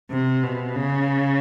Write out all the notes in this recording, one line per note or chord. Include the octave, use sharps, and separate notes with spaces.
C3
B2
C#3